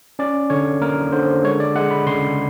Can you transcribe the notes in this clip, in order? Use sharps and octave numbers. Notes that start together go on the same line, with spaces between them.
C#4 D5
D3 C#5
A#3 A#4
D3 C5
G#3 C#5
D5
G#3 F#5
B5
C#3 C6